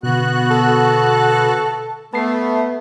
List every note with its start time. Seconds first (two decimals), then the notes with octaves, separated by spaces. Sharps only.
0.03 B2 D3 B3 F#4 F#6
0.50 A4
2.14 A3 B3 A5 C7